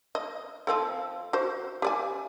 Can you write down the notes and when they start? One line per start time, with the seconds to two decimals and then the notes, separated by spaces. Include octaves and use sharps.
0.15 D#5
0.67 F3 C4 A4
1.33 F#4 C5
1.82 G4 D5 G#5